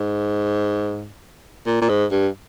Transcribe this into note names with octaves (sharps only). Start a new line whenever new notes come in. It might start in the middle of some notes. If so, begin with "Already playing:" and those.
Already playing: G#2
A#2
A#2
G#2
G2